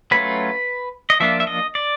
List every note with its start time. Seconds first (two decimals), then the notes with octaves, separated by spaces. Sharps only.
0.11 F#3 A3 C#4 F4 B4
1.10 D#5
1.20 F3 A#3 D4 F4 E5
1.40 E5
1.47 D#5
1.75 D5